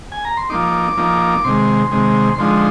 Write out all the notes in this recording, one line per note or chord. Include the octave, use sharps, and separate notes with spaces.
G#5
A#5
C6
F3 A#3 D#4 D6
F3 A#3 D#4
C3 D#3 G#3 C6
C3 D#3 G#3
D3 F3 G#3 D#4 C6